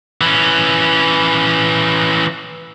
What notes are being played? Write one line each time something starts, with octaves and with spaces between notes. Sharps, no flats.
E3 C#4